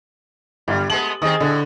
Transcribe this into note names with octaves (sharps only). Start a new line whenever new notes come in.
G1 G3
G#3 A3 B3 F#7
D#3 C4 G#4 D#5 D#6
A2 D3